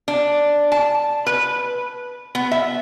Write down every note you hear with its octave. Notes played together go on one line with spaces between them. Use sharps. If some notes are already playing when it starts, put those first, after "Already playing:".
D4
A5
B4
B3
E5